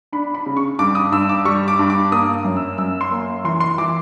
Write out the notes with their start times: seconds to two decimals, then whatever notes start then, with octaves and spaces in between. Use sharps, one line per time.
0.12 D4 B5
0.35 B5
0.46 C#3
0.57 C#6
0.79 G2 D6
0.95 D#6
1.12 G2 E6
1.29 D6
1.45 G3 C#6
1.68 D6
1.79 G2
1.90 D6
2.12 A#3 D#6
2.44 F#2
2.56 E6
2.78 F#2 E6
3.01 C6
3.11 A#3
3.44 E3 C6
3.60 C6
3.78 E3 D6